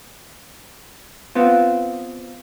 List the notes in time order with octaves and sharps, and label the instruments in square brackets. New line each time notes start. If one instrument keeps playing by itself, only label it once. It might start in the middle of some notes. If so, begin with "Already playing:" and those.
[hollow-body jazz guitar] B3 C4 F4